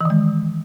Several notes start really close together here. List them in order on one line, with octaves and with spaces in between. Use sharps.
E3 D#3 G#3